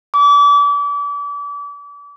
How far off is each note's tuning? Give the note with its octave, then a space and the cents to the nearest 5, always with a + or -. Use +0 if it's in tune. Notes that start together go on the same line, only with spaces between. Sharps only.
D6 -35